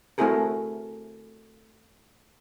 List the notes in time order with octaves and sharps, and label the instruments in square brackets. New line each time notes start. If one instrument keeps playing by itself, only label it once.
[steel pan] A3 C4 E4 F#4 G#4 A#4